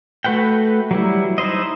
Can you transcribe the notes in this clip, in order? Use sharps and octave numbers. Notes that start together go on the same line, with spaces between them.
A3 F#4 B4 F#5 G5
F#3 G3 E4
D#4 E4 C5 D#5